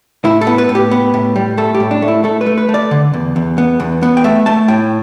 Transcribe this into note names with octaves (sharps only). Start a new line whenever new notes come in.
A2 E4
A4
B3
B4
A2
G4
B3
A2
G3
A3 A4
G4
A2
D4
A3
E4
A3 A4
B4
A3
B4
A3
D5
D3
E2
E2
B3
E2
B3
G5
A3 E5
A3 A5
A2 G5